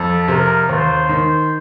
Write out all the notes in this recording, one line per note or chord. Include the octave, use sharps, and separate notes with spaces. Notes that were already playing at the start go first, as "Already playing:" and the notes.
Already playing: F2 A4
C3 A#4
D#2 C5
D#3